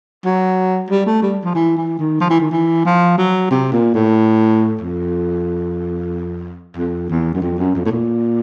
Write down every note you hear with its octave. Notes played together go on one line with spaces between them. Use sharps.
F#3
G3
A3
G3
F3
E3
E3
D#3
F3
E3
D#3
E3
F3
F#3
C3
A#2
A2
F2
F2
E2
F#2
F2
F#2
F2
A2
A#2